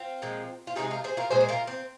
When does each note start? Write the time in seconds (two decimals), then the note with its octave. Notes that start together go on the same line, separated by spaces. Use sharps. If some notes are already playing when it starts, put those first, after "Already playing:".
Already playing: C4 F4
0.22 A#2 F3 G#3
0.67 F4
0.76 C3 F3 G#3 D#4 G#4
0.91 F4 A#4
1.04 G#4 C5
1.17 F4 A#4
1.31 A#2 G#3 G#4 C5
1.41 C5
1.49 F4 A#4
1.67 C4